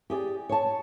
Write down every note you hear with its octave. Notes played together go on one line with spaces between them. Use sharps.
G4 G#4 D5
C#5 A5